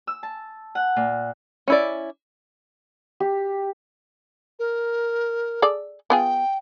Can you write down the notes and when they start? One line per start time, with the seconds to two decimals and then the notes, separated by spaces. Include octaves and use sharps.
0.07 E6
0.23 A5
0.75 F#5
0.96 A#2
1.68 C#4 E4 D5
3.20 G4
4.59 A#4
5.62 G#4 A4 D5
6.10 B3 F4 G#4 G5